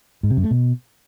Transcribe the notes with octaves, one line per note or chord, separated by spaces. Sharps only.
G#2
C3
F#2
A3
B2